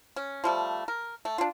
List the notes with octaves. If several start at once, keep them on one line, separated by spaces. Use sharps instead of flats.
C#4
F3 G3 A3
A#4
A3
D4 F4